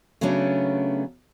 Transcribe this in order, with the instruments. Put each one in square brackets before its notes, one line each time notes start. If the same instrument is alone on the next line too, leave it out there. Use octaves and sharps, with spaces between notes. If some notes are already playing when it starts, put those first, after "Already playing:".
[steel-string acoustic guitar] C#3 F#3 A3 B3 C#4 D4